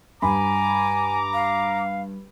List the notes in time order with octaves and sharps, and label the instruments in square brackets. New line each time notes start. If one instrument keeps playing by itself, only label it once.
[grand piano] G2 B5 [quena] G#5 [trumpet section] A#5 D6
[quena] F5